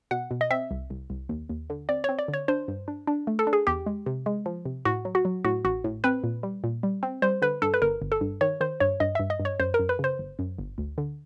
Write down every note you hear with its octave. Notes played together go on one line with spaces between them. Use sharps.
B2 F#5
B2
D#5
C4 E5
C2
C2
C2
D#2
D#2
D3
C4 D5
C4 C#5
D5
D3
C#5
D4 C5
G2
D4
D4
A3
A4
D4
G#4
E2 G4
G#3
C3
G#3
F3
C3
A2 F#4
F#3
F#4
F#3
A2 F#4
A1 F#4
A2
C4 B4
A#2
G3
A#2
G3
C4
G3 C5
D3 B4
G2 A4
B4
G1 A#4
G1
A4
G2
D#3 C#5
D#3 C5
G2 C#5
G2 D#5
G2 E5
D#5
G2
C#5
F#2 C5
A#4
F#2
B4
C#3 C5
G1
F#2
G1
D2
D3